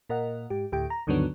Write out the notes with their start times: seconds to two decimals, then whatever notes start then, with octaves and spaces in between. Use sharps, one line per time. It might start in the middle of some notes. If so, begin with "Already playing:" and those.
0.10 A#2 A#4 D#5 F#5
0.50 G#2 G4
0.72 D2 A2 G4 G5
0.90 A#5
1.07 D2 G2 D3 D#3 F#3 B3